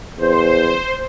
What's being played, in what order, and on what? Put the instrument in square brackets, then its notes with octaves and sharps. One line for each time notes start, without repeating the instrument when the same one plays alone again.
[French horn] E2 [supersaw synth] C5